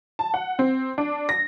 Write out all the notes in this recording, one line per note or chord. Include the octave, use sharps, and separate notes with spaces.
A5
F#5
C4
D4
A#6